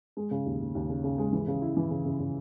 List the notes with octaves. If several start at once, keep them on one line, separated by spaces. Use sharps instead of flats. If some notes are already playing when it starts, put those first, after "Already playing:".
G#3
C#3
D#2
D#2
D#2
C#3
C#3
G#3
E3
C#3
E4
E3
C#3
C#3
C#3